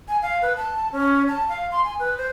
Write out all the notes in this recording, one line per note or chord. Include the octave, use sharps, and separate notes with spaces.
G#5
F5
B4
A5
C#4
A5
F5
C6
G#5
B4
C5